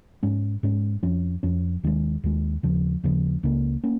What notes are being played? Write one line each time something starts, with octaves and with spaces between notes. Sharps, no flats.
G#2 G#3 C#4
G#2 G#3 C#4
F2 F3 C#4
F2 F3 C#4
D#2 D#3 G#3
D#2 D#3 G#3
D#2 C#3 F3
D#2 C#3 F3
C#2 C#3 A#3 C#4
A#3 C#4